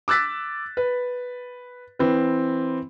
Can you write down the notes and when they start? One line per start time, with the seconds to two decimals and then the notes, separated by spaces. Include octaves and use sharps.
0.08 D6 E6 F#6 A6 B6
0.77 B4
1.99 E3 C4 B4